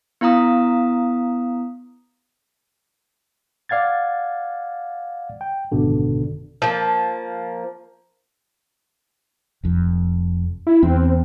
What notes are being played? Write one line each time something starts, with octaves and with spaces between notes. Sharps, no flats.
B3 E4 F5 A#5 D#6
D5 F5 F#5 G#6 A6
G5
G#1 F#2 B2 D3
F3 A#3
F1 F2
E4
E2 C4